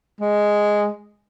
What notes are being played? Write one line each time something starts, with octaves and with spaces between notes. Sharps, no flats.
G#3